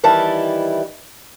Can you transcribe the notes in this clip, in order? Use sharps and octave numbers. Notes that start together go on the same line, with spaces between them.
D#3 E3 G3 E4 A5